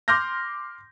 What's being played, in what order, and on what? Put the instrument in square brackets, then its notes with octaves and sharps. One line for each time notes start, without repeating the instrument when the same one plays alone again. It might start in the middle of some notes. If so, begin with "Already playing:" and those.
[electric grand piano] C6 D6 F6 G6 A#6